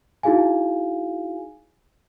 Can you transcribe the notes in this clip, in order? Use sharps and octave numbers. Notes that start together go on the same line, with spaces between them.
D#4 E4 F#4 G#4 F5 G#5